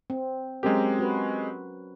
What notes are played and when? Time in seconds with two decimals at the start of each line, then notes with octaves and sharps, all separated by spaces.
0.10 C4
0.63 F#3 G#3 C4 C#4 G4 A#4
0.99 F#4 B4